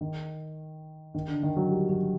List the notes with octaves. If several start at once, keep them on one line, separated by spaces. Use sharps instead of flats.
D#3
D#3
D3
D#3
F#3
G3
F#3